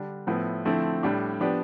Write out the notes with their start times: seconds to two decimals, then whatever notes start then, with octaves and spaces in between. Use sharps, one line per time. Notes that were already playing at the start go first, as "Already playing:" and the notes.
Already playing: D3 G3 D4
0.27 A2 F3 B3 E4
0.65 D3 F3 A3 C4 E4
1.03 A2 G3 D4 G4
1.40 F3 B3 D4 G4